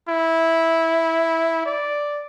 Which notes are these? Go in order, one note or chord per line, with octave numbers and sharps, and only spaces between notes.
E4
D5